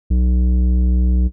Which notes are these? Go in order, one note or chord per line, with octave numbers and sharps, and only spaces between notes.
B1